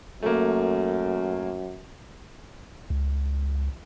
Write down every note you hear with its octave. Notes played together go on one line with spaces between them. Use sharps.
F#2 A3 A#3
C#2